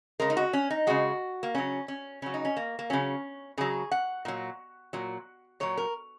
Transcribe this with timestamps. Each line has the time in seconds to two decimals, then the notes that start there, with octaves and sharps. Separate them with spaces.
0.20 C#3 G#3 A#4
0.30 D#4
0.37 F#4
0.53 C#4
0.70 D#4
0.87 C#3 G#3 F#4
1.43 A#3
1.55 C#3 F#3 C#4
1.88 C#4
2.22 C#3 F#3 C#4
2.34 D#4
2.45 C#4
2.57 A#3
2.79 A#3
2.90 C#3 F#3 C#4
3.58 C#3 F#3 G#4
3.91 F#5
4.25 A#2 F#3
4.93 A#2 F#3
5.60 A#2 F#3 C#5
5.77 A#4